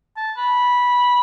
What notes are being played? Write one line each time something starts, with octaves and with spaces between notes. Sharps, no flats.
A5
B5